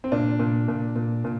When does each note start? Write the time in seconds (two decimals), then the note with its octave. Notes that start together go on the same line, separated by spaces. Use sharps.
0.04 C4
0.12 A#2 D4
0.39 A#2
0.68 A#2
0.96 A#2
1.24 A#2